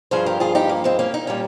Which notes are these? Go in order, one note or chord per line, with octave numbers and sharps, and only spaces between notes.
G2 F3 G#4 C5
G4 A#4
F4 G#4
D#4 G4
A#3
G#3 C4
A#3 C#4
D#4
A#2 G3 C#4